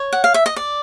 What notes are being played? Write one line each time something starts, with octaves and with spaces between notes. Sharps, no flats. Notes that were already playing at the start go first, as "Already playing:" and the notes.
Already playing: C#5
F#5
F5
E5
D#5
D5